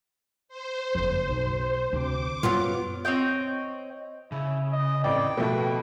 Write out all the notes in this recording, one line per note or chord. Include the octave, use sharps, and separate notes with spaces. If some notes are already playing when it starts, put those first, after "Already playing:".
C5
F#1 F2
B1
D2 C3 D6
F#2 A#2 F#3 G3 B3 F4
C4 C#5 D#5 G5
C#3 E4
D#5
A1 F2 D5 G5
B2 F3 A3 B4